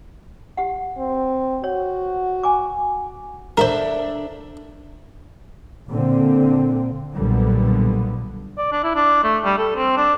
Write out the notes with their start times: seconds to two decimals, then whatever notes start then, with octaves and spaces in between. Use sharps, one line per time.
0.57 G4 F#5
0.98 C4
1.64 F#4 C#5
2.43 G#5 D6
3.57 D4 A4 A#4 C5 E5
5.89 A#2 D3 C4
7.14 B1 A#2 D3 G3 B3
8.58 D5
8.72 D4
8.84 E4
8.95 D4
9.24 A3
9.44 G3
9.58 A4
9.76 C4
9.97 D4